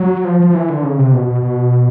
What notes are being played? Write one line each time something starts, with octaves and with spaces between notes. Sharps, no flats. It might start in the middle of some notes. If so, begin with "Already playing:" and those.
Already playing: F#3
F3
F3
F3
E3
D3
C#3
C3
B2
B2
B2